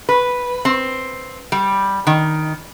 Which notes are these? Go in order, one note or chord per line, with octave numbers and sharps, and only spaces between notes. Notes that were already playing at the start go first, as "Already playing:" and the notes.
B4
C4
G3
D#3